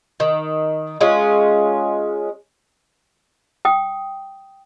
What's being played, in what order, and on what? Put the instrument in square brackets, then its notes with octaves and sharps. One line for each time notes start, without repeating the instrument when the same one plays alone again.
[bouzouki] D#3
G#3 C#4 F4
[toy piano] G5 D#6